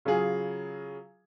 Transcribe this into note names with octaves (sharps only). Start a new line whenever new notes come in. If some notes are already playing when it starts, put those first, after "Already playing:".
C#3 F#3 F4 G#4